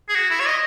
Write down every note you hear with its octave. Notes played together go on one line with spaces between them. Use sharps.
G#4
F#4
E4
C#5
D#5